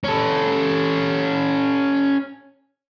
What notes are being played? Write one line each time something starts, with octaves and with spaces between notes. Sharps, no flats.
C#4 A4